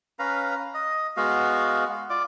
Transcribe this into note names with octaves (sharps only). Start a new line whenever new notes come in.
C#4 B4 F5 A#5
D#5
G#3 B3 F#4 F5
F4 D5 D6